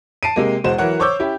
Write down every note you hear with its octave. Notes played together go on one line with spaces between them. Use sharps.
A5 C7 D7 D#7
C3 G#3 A#3
E1 G#3 F#4 C5 E7
E3 F#3 A#4 C#5 F#5
C5 C#5 C#6 D6 E6 G6
C#4 E4 G4 C#5